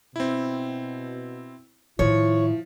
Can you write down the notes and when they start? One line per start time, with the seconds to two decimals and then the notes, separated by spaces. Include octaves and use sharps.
0.16 B2 C4 E4
1.99 A2 D#3 F3 E4 C#5